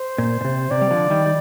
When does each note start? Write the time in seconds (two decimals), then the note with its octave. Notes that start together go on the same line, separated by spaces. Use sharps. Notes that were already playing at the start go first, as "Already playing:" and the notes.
Already playing: C5
0.18 A#2
0.41 A#2
0.44 C3
0.71 C3 D5
0.81 G3
0.91 D3 F3
1.10 D#3 G3
1.26 G3